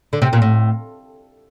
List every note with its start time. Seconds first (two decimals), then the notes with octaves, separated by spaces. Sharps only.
0.13 D3
0.22 C3
0.33 A#2
0.42 A2